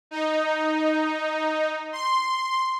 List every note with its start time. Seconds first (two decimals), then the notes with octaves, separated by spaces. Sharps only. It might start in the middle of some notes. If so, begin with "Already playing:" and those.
0.11 D#4
1.92 C6